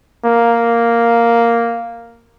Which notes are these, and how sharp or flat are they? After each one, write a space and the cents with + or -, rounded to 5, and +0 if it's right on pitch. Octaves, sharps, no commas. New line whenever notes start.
A#3 +0